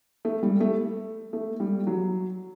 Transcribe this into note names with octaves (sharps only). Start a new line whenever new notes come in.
A3
G3
A3
A3
G3
F#3